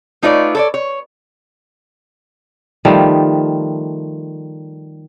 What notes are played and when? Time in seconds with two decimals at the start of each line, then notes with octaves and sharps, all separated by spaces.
0.22 A3 D#4 F4 B4 C#5 D5
0.55 A4 C#5 D5
0.74 C#5
2.85 D#3 F3 G3 A3